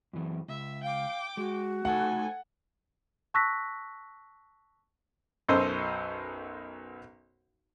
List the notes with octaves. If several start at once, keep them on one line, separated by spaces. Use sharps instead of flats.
F#2 E3
C#2 E5
F5 G5 D6
G#3 F#4
A3 D#4 A4 C5 F#5 G#5
A5 C#6 E6 F#6 A#6 B6
B1 F#2 A4 C5 D#5 C6